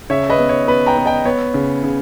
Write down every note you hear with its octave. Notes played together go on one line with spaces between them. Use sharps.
C#3 C#5 E5
B4 D#5
B3
C#5
B3 B4
G5 A#5
B3
D#5 G5
B3 C#5
C#3
C#3